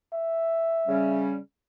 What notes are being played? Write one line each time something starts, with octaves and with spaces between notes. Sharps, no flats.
E5
C#3 G3 C#4